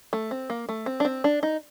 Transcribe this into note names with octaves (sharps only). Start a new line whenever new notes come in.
A3
C4
A#3
A3
C4
D4
C4
D4
D#4